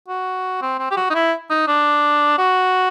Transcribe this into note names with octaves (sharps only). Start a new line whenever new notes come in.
F#4
C4
C4
G4
F#4
D#4
E4
D#4
D4
F#4